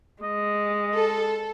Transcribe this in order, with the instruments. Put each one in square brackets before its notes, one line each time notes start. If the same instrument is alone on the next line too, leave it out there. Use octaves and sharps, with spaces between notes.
[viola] G#3 [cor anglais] D#5
[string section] A4